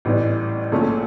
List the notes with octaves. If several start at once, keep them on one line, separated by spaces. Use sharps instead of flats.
A1 A2 E3 G3
A#1 A#2 A3 C#4